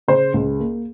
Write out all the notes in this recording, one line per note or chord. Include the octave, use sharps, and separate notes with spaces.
C#3 C5
C#2
A#3